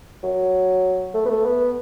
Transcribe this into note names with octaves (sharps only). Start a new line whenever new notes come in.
F#3
A3
B3
A3
B3